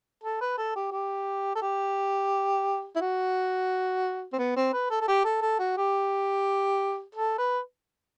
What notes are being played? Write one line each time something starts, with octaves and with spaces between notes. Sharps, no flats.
A4
B4
A4
G4
G4
A4
G4
E4
F#4
C4
B3
C4
B4
A4
A4
G4
A4
A4
F#4
G4
A4
B4